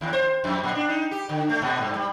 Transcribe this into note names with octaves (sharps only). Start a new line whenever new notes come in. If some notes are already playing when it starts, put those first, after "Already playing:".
D#2
C5
F2
A#2
D4
D#4
G4
D3
A3
A#2
G2
G3